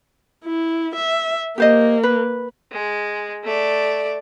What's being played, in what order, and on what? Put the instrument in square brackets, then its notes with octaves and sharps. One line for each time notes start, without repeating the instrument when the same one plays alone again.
[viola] E4
E5
[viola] A#3 [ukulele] G4 C5 D#5
[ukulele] B4
[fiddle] G#3
A3 D5